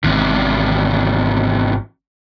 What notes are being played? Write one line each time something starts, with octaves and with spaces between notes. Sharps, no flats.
G#1 E2 G#2 C3 D#3